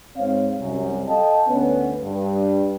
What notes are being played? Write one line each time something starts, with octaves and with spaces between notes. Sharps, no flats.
G#2 C4 C#5 F5
C2 F#2
A4 D#5 F5 G5 A5
D2 B3 C#4
G2